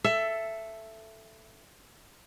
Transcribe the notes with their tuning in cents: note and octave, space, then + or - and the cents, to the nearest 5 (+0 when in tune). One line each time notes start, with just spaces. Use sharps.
A4 +0 E5 +15